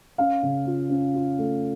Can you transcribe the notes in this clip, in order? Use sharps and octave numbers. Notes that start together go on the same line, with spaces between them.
C#4 F5
C#3
F4
C#4
F4
A3